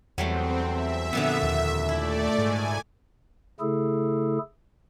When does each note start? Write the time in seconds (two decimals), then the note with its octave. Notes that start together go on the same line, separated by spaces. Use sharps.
0.18 E2 F#3 G3 A3 C4
0.67 E5
1.13 F2 A#2 D3 B3
1.43 D#2
1.89 A3 E4 D5
2.38 G#2 G#5
3.60 C#3 A3 E4 G#4 A4